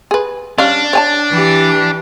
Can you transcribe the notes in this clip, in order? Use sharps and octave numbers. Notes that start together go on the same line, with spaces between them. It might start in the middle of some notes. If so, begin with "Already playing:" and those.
G#4 B4
G3 C#4 D4 F5
C#5 G#5 A5
E3 G4